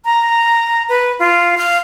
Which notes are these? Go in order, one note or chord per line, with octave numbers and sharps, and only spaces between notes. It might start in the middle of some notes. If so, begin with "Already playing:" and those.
A#5
B4
F4
F5